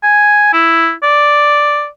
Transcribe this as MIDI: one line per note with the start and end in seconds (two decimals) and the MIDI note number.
0.03 0.51 80
0.53 0.92 64
1.03 1.87 74